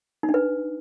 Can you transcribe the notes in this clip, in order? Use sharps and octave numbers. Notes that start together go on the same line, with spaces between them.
D#4
D4
B4